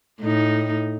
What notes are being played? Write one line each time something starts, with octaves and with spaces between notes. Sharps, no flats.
A2 D#4